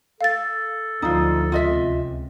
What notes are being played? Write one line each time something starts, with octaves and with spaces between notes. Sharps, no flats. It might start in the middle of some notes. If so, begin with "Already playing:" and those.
A4 F5 A6
D2 F3 D#4 F4
C#2 C3 F4 D#5 E5